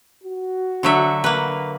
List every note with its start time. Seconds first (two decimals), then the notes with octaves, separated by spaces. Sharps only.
0.23 F#4
0.83 D3 F#3 E5
1.24 A#3 B4